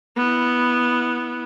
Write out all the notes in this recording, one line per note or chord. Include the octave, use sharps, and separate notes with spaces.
B3 E4